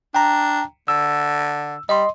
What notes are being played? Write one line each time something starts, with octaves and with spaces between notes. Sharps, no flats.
D4 G5 A#5
D3 E6
G3 D#5 C6